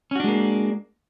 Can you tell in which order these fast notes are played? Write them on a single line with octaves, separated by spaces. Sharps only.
C#4 F#4 D4 G#3 A#3